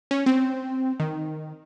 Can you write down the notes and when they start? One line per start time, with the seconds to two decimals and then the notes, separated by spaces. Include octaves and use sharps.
0.11 C#4
0.26 C4
1.00 D#3